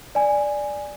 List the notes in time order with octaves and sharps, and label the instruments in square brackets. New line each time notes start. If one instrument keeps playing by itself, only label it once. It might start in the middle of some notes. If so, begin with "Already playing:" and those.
[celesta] D5 G#5